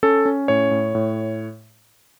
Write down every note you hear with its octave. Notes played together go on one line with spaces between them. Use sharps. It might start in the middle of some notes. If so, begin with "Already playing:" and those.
C#4 A4
C#4
A2 C#5
A2
A2